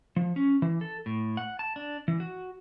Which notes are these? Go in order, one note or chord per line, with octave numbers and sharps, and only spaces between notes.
F3
C#4
E3
A4
A2
F#5
A5
D4
E3
F#4